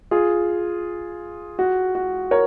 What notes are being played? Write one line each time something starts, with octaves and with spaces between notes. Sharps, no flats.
F4 G#4
F#4
F#4
A#4 C#5